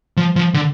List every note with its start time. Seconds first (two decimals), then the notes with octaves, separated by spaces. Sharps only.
0.17 F3
0.36 F3
0.54 D3